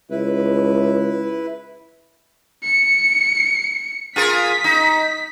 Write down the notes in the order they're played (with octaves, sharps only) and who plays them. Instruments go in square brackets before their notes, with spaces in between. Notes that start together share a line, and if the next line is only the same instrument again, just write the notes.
[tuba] C#2 [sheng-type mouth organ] E4 B4
[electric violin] C#7
[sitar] F4 G#4 A#4 [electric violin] B6
[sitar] D#4